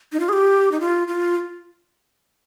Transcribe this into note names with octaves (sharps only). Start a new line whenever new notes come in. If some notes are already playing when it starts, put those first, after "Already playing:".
D#4
F4
G#4
G4
D#4
F4
F4